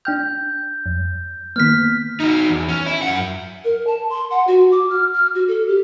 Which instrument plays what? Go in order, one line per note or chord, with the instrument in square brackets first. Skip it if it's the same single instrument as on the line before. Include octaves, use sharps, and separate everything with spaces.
[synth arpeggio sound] D4 G5 F6 [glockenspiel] G6
[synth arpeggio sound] F2
[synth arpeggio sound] D#3 A#3 B3 [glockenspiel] F6 B6
[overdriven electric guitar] D#4 F#4
E2
C#4
E4
F#2 F#5
[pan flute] A#4
A5
C6
F#5
F#4
D6
F6
F6
F#4
A4
G4